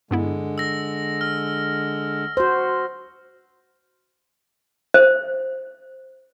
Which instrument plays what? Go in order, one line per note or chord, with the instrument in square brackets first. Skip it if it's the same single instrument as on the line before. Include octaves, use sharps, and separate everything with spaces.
[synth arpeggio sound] G2 B3 E4 [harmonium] D3 G#3
[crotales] E6 A#6
F6
[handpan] F#4 C5
[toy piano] C5